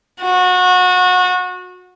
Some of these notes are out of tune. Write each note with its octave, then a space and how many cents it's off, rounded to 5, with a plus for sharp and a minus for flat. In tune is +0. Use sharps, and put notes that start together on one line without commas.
F#4 -25